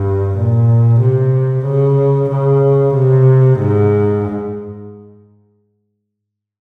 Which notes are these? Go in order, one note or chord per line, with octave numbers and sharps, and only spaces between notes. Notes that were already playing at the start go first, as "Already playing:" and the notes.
Already playing: G2
A#2
C3
C#3
C#3
C3
G#2